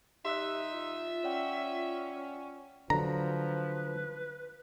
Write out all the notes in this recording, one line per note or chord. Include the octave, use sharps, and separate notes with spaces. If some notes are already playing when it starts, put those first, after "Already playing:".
D#3 D#4 G4 E5 C6 E6 F#6
F4
C#4 D5 F#5 G5
D3 F3 F#3 B4 A#5